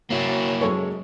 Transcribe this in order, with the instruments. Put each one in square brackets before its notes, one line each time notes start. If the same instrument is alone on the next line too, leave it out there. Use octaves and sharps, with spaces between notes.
[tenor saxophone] F#3 [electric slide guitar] A#3 E4
[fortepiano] F#2 A4 C#5 [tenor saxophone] G#3